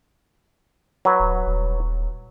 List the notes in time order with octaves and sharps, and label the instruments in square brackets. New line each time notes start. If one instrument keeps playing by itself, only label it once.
[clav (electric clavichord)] F#3 B4
[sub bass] D1
D#1